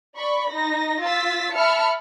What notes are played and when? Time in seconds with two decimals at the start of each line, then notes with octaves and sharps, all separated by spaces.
0.16 D5 B5 C#6
0.51 D#4 A#6
1.02 F4 E6 A6 B6
1.54 E5 A5 B5 F6 C#7